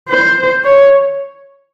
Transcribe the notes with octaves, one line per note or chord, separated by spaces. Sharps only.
C5
C#5